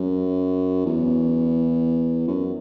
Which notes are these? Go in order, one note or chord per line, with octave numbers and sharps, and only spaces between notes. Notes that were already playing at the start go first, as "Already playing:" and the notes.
Already playing: F#2
E2
F#2